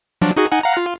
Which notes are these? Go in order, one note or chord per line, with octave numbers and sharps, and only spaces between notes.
F3 F#3 D4
D#4 F#4 G#4
D#4 F#5 G#5
F5 F#5 A#5
F4